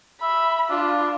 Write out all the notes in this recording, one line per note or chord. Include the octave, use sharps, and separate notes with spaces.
E5 B5
D4 F4